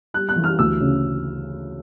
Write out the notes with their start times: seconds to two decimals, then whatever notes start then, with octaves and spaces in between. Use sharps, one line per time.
0.14 G3 F#6
0.29 F#6
0.36 E3
0.44 F6
0.59 D2 E6
0.81 C#3